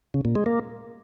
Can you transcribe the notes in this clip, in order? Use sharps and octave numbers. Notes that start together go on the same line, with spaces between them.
C#3
A#2
G#3
A#3